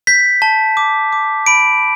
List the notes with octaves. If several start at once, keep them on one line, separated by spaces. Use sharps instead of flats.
G6 B6
A5
D6
D6
B5 D7